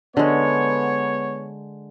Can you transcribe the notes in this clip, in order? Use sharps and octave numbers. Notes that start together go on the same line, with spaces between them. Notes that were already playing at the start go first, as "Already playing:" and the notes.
D3 G#3 B3 C#5